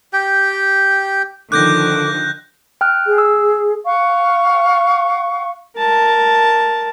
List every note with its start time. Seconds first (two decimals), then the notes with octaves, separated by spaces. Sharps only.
0.13 G4 G5
1.52 D3 D#3 F3 A4 D6 F#6 G6 A#6
2.81 G5 F6 F#6
3.06 G#4
3.18 E6
3.85 F5 F#5 C#6
5.77 A#4 A5